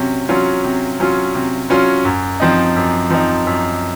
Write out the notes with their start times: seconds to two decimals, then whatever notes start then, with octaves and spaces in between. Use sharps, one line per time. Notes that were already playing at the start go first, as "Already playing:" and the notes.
Already playing: C3 F#3 C#4
0.29 F#3 C#4 F4
0.64 C3
1.00 F#3 C#4 F4
1.35 C3
1.70 F#3 C#4 F4
2.05 F#2
2.40 F3 C4 D#4
2.76 F#2
3.10 F3 C4 D#4
3.47 F#2